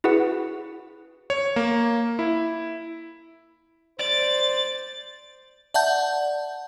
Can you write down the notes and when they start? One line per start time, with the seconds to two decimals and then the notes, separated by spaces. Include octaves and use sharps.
0.04 E4 F#4 G#4 B4 F#5
1.30 C#5
1.56 A#3
2.19 E4
3.99 C5 D5 A6
5.74 D5 E5 F#5 A5 G6